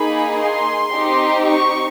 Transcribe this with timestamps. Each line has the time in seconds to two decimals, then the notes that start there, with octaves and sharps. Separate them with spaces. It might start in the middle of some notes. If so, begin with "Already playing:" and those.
Already playing: A#3 D#4 G#4 B5
0.40 C6
0.93 C4 D#4 G4
1.46 C#6